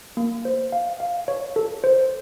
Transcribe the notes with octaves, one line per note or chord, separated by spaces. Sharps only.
A#3
C5
F5
F5
C#5
A4
C5